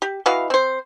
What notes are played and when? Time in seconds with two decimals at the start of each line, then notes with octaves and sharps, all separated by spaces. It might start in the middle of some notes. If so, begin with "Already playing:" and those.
0.02 G4
0.26 E3 F#4 D#5 F5
0.50 C4 C5